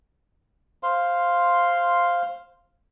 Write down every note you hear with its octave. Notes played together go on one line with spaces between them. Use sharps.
C5 F5 C6